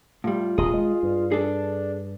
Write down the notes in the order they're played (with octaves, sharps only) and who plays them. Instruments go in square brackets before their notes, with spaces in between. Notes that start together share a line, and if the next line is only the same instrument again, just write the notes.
[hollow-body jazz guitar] A2 G3 [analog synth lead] F4
[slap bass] D#1 [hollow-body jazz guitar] G#4 D#5
[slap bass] G#3
G2
[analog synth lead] D4 [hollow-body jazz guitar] G#4 A4